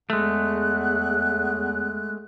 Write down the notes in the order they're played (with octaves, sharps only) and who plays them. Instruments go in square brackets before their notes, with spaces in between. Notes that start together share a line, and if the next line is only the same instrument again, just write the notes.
[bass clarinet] E2 [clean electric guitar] G#3 A3 [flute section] F#6